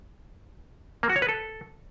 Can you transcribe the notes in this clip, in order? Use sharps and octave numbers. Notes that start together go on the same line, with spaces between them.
A#3
F#4
C#5
B4
A4